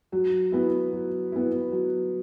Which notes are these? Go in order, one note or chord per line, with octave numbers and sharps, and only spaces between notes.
F#3
B3 E4
F#3
B3 E4
F#3